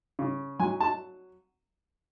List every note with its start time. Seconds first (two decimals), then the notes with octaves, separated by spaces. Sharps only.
0.19 C#3
0.59 F#3 G#5
0.80 A5